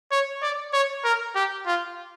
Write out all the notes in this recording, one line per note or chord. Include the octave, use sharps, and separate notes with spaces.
C#5
D5
C#5
A#4
G4
F4